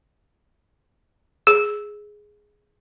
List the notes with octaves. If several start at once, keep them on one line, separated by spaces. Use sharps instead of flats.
G#4